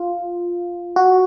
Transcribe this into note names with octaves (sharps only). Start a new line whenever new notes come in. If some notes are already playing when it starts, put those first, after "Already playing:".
Already playing: F4
F#4